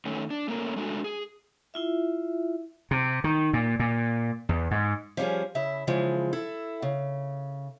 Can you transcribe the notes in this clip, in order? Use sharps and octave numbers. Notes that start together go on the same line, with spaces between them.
D#3 A3 C#4
D4
A3 A#3 C#4 A#4
G#3 A3 D4 F#4
G#4
E4 F4 E5
C3
D#3
A#2
A#2
E2
G#2
F3 G3 C4 C#4 G#4
C#3 E4 E5
C#3 E3 F3 G#3
E4 A4
C#3